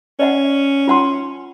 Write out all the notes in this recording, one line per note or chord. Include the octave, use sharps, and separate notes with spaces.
C#4 D5 D#5 F#5
F4 F#5 C6